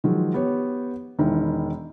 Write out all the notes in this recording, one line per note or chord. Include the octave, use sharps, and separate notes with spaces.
D#3 F3 F#3 G#3
B3 G4 C#5
E1 D#3 E4